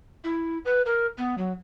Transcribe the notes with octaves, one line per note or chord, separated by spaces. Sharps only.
E4
B4
A#4
B3
F#3